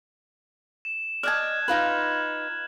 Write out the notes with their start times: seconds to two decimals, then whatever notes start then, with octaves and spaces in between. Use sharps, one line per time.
0.85 E7
1.23 D5 D#5 A5 F6 F#6 G#6
1.68 D#4 F4 B4 F#7